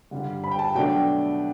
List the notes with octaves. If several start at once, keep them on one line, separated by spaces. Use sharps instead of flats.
G2 D3 G3
B5
G5
A5
B2 F#3 A3 D4 G5